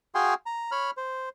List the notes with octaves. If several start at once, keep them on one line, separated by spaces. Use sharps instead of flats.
F#4 G#4 F5 G5 G#5 C6
A#5
C#5 B5 F6
C5